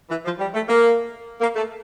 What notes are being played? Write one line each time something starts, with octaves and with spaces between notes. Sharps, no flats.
E3
F3
G3
A3
A#3
A#3
A3